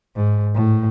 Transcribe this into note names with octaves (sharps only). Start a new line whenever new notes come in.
G#2
A2